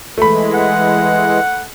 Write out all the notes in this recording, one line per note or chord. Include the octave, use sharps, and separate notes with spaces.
E3 G#3 A3 B5
F#5